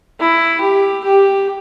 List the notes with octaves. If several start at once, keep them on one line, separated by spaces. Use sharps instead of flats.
E4
G4
G4